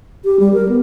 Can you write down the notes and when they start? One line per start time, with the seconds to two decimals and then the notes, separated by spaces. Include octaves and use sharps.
0.25 G4
0.40 G3
0.54 A#4
0.69 B3